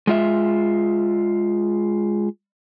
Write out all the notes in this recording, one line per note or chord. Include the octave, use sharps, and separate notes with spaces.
G#3 F4 E5